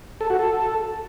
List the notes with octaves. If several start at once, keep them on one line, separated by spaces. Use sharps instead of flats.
A4
F#4
A4